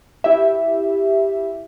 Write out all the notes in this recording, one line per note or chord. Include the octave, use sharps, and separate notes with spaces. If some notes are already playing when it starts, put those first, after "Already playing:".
E4 G4 E5